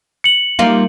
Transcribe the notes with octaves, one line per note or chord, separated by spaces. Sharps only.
C#7 F#7
G3 A#3 D#4 F4